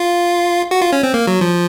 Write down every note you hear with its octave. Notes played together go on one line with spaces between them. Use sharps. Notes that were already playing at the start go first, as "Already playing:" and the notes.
Already playing: F4
F#4
F4
C#4
C4
A#3
F#3
F3